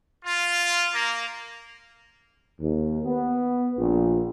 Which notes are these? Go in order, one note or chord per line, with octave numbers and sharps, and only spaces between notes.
F4
A#3
D#2
B3
A#1